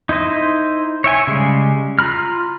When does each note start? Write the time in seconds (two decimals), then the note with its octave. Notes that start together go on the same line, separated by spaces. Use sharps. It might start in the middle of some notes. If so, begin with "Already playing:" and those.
0.09 D#4 E4 C5 D#5
1.04 C#5 E5 G5 G#5
1.27 C#3 G3 G#3
1.99 F4 A#5 B5 F6